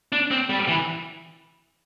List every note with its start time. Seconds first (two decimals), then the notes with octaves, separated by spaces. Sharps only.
0.12 D4
0.31 C4
0.50 G3
0.68 E3